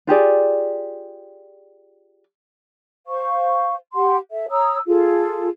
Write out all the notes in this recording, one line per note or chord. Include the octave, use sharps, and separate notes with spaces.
F4 G4 G#4 D5
C5 F5 C#6
G4 F#5 C6
A4 E5
C#5 A#5 D#6 E6
F4 G#4 A4